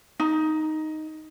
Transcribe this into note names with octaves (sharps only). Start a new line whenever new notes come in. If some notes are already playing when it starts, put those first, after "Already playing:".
D#4